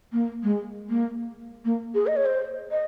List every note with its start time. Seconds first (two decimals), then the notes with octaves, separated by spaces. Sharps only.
0.13 A#3
0.43 G#3
0.89 A#3
1.65 A#3
1.95 G#4
2.07 D#5
2.16 C#5
2.25 C5
2.71 D#5